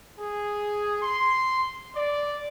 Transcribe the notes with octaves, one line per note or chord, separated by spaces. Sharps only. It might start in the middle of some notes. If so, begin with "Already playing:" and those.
G#4
C6
D5